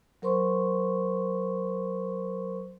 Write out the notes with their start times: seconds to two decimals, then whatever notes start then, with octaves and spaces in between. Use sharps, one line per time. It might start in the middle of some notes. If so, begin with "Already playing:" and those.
0.22 F#3 A#4 C5 C6 C#6